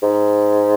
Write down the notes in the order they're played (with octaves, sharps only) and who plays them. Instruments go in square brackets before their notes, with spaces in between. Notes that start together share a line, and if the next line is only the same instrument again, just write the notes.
[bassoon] G#2